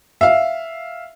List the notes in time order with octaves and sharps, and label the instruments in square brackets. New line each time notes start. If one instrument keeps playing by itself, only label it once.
[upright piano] E5 F5